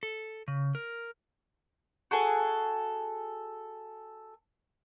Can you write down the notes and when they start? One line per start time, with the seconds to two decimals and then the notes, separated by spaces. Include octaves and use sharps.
0.03 A4
0.48 C#3
0.75 A#4
2.11 F#4 G#4 A4 G#5